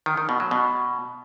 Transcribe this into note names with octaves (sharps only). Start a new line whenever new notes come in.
D#3
D#3
B2
F#3
B2